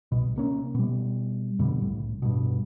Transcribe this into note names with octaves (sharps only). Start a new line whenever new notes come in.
C2 B2
C3 A#3 C#4
B2 G3
F2 B2 D3 G3
C2 A2
G2 B2